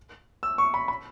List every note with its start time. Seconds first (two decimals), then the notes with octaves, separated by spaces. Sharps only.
0.43 E6
0.58 C#6
0.74 B5
0.88 B5